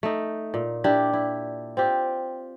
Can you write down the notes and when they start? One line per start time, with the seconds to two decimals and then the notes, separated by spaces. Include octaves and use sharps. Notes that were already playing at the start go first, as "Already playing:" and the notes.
0.03 A3 D#4
0.54 A#2
0.84 D4 E4 G4
1.13 E4
1.77 C4 F4 G4